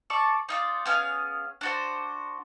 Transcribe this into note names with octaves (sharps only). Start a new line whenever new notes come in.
A4 D5 C#6
D#4 F4 D5
B3 C#4 G#4 F5
D4 F#4 C5